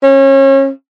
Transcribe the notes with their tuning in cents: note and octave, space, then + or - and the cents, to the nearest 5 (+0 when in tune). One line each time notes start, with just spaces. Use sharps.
C#4 -30